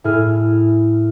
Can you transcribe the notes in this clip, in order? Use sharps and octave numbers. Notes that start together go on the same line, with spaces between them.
A2 E4 G#4 F6